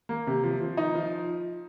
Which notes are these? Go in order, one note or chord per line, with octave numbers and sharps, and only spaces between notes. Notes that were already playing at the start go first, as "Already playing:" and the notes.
A#3
C3
F3
F3
D#4
F3